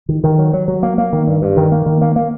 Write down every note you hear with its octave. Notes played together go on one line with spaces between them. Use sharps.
D#3
D#3
F#3
F#3
F#3
A#3
A#3
D#3
G2
G2
D#3
A#3
D#3
A#3
A#3